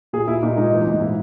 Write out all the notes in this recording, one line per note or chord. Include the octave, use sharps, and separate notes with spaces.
A#2 G#4
A#2 E4
A#2 D#4
G#2 D#4
E3
D#4
G#2
A#2 E4